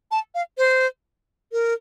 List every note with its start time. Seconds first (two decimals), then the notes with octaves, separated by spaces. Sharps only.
0.11 A5
0.35 F5
0.58 C5
1.52 A#4